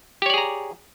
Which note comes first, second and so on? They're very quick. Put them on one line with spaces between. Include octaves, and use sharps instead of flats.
G4 C#5 D5 G#4 A#5